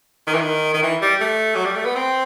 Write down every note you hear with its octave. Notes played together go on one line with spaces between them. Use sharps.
D#3
E3
D#3
D#3
E3
G3
A3
F#3
G3
A3
B3
C4